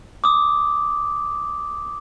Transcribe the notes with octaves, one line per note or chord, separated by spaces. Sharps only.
D6 D#6